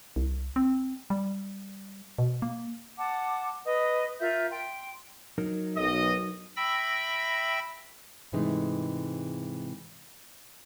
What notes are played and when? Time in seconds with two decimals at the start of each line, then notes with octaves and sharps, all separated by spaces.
0.16 C2
0.56 C4
1.10 G3
2.18 B2
2.42 A#3
2.97 F#5 A5 D6
3.65 B4 D#5 D#6
4.20 F4 A#4 E5 G6
4.51 G5 C6
5.38 F#3 D#4 A#4
5.77 B1 D#5
6.56 E5 G5 B5 E6 A#6
8.33 G#2 C3 E3 G#3 A3 D#4